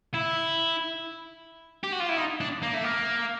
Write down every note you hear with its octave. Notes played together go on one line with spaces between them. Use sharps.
E4
G4
F#4
F4
E4
D#4
D4
A#3
A3
A#3